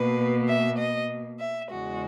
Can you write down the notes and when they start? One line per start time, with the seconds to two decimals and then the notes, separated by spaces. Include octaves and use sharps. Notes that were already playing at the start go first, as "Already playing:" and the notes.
Already playing: B2 A#3 B4
0.48 E5
0.78 D#5
1.40 E5
1.72 E2 C#3 G#3 F#4